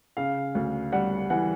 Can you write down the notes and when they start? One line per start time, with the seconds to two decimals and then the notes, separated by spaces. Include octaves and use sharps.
0.17 C#3 F5
0.55 D2
0.92 G3 F#5
1.30 E3 F#5